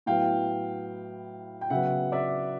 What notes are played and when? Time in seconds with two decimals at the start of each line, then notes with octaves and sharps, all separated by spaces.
0.06 A2 F#3 B3 F5 G5
1.61 G5
1.70 C#3 F#3 B3 E5 F#5
2.12 D5 E5